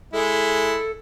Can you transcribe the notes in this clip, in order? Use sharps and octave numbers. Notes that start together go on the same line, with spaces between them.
G#3 E4 A4